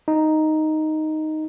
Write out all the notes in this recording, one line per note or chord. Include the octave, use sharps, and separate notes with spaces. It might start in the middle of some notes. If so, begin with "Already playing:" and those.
D#4